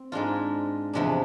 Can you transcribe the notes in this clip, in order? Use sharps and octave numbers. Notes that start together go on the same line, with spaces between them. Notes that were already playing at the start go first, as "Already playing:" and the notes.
Already playing: C4
G#2 G#3 D4 F4
E2 C3 F3 G#3 D4